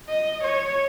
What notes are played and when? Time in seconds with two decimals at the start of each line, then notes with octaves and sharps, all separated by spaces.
0.08 D#5
0.44 C#5